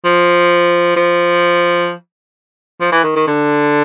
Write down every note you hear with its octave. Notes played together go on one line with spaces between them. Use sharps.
F3
F3
F3
E3
D#3
D#3
D3